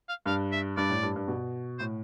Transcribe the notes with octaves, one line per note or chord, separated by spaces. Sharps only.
F5
G2 F5
E5
G2 D5
A2
G2
G2
B2
A2 C5